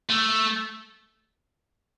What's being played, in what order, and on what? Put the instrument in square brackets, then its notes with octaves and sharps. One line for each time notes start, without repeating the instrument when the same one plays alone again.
[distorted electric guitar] A3